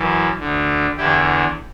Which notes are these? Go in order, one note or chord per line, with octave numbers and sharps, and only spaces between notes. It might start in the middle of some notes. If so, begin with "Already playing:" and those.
Already playing: F#2 E3
D2 D3
E2 D3 E4 G4